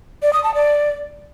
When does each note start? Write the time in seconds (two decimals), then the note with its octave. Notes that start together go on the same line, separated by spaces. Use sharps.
0.22 D5
0.33 D#6
0.44 A5
0.54 D5